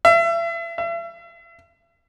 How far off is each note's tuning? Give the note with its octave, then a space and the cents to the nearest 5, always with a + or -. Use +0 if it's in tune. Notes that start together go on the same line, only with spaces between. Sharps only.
E5 +35
E5 +40